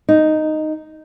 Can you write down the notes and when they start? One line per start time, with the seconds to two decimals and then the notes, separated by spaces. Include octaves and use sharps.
0.09 D#4